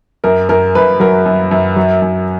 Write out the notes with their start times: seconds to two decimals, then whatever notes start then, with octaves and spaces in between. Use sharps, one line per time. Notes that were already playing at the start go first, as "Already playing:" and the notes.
0.24 F#2 A#4
0.49 F#2 A#4
0.75 F#2 B4
1.00 F#3 A#4
1.26 F#2
1.51 F#2
1.76 F#3
2.02 F#2